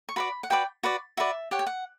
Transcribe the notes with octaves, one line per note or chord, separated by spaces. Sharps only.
C#6
F#4 B4 D5 B5
F#5
F#4 B4 D5 G5
F#4 B4 D5
F#4 B4 D5 E5
G4 C#5 F#5
G5
F#5